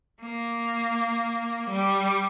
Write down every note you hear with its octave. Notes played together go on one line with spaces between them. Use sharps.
A#3
G3